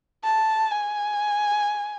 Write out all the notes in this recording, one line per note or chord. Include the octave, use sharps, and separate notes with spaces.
A5
G#5